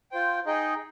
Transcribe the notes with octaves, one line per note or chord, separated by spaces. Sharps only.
F4 C5 G5
D#4 G#4 D#5 G5